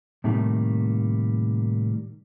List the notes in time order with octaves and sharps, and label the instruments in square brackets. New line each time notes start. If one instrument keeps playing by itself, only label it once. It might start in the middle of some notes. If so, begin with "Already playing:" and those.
[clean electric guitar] A2 C3 D#3 G3 A3 A#3